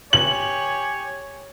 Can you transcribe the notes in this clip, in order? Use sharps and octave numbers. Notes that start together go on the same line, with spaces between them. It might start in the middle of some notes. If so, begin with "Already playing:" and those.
G4 C#5 G#5 F#7